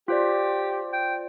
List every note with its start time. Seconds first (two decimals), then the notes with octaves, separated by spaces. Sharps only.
0.08 F4 G4 C5 D5
0.93 G5